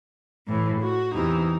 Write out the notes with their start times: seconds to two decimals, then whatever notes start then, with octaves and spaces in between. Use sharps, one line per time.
0.47 A2 E3
0.81 F#4
1.14 E2 C3 E3 D#4